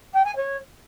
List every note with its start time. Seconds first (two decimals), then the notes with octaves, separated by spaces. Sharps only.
0.13 G5
0.24 G#5
0.36 C#5